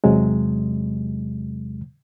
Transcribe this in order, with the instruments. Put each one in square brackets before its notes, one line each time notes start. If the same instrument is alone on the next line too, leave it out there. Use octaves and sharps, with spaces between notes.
[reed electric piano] E2 C3 F#3 G#3